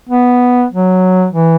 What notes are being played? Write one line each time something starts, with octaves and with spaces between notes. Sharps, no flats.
B3
F#3
E3